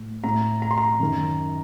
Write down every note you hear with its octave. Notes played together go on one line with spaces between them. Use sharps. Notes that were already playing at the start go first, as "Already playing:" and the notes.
Already playing: A2
A2 A#5
A#5
C6
A#5
F#2 D#3